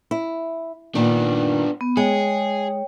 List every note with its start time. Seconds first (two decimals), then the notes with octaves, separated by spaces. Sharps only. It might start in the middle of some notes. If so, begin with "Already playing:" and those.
0.11 E4
0.95 A#2 D#3 B3 D4
1.81 B3
1.97 G#3 G#4 C#5 G5